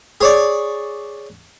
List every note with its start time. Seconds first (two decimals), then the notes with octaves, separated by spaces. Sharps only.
0.21 G#4 C#5 D5